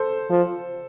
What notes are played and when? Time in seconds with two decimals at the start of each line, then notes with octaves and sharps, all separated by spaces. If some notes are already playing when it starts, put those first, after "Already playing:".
Already playing: A4 C5
0.30 F3